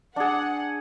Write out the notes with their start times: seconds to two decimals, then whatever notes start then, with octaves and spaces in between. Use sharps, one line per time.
0.16 D4 G#4 F#5